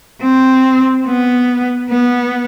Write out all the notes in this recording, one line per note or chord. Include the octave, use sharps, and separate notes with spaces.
C4
B3
B3